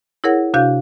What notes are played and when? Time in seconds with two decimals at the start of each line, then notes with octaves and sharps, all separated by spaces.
0.24 E4 G#4 A#4 C#5 F#5
0.54 C3 D4 F#4 F5 G6